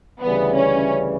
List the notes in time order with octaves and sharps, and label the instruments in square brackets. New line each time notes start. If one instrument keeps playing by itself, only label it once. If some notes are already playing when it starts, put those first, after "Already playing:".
[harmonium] D2 C#3 E3 G3 [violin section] B3
[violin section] C#4